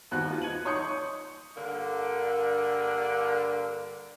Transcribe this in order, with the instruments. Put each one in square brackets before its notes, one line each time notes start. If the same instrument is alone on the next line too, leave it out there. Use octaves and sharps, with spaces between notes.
[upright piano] D#2 B3 F#4 C5 F#6
D#4 F4
G#6 C#7 D#7 F#7
D#4 C#5 C6 D#6 G6 C#7
C#6
[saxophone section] G2 D3 A#3